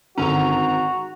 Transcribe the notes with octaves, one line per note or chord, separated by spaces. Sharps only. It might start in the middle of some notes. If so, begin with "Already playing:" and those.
G#1 G2 D3 C#4 F#4 A#5